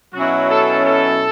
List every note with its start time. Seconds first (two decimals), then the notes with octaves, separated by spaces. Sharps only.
0.13 B2 F#3 C#4 E4 F#4
0.50 A4
0.85 A4